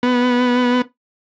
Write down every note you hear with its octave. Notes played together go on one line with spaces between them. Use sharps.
B3